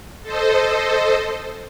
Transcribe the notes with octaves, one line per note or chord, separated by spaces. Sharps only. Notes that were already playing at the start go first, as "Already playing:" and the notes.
A4 C5 D#5